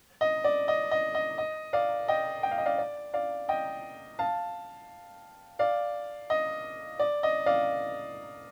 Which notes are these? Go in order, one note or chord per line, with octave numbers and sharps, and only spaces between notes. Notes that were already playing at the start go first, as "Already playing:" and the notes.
D#5
D5
D#5
D#5
D#5
D#5
D5 F5
D#5 G5
G5
F5
D#5
D5 F5
D5
D5 F5
D#5 G5
F5 A5
D5 F5
D#5
D5
D#5
D5 F5